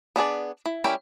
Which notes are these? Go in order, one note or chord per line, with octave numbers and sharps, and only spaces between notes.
B3 D4 G#4 D5
E4
G3 C#4 E4 A#4 G5